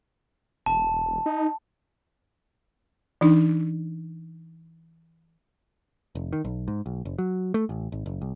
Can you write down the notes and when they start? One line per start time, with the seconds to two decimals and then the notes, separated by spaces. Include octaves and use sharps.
0.66 E1 A5
1.26 D#4
3.21 E3 D4 D#4
6.15 F1
6.33 D#3
6.44 B1
6.68 G#2
6.86 B1
7.05 F#1
7.18 F#3
7.54 A3
7.69 A1
7.92 G#1
8.06 F#1
8.22 C2